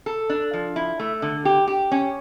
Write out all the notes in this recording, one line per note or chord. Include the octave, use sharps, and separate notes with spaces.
A4
D4
F3
E4
A3
D3
G4
G4
C#4